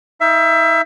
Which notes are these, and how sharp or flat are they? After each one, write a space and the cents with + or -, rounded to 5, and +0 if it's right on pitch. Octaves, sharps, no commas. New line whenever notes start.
D#4 +40 E5 +25